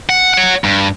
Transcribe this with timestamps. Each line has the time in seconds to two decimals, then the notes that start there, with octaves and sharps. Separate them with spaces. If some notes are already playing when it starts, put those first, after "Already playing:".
0.09 F#5
0.34 C#5 F#5
0.64 G2